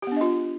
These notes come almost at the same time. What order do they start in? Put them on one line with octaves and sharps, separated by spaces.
G4 B3 D4 D#5 F4